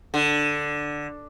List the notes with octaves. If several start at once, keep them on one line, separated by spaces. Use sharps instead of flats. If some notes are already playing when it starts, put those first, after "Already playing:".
D3